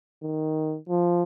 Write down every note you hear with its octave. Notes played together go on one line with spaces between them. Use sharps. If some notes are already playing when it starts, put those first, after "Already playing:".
D#3
F3